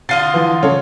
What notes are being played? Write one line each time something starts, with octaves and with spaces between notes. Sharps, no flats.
D3 F4 D#5 A6 C7 D#7
E3 F3
C#3 A4 C#5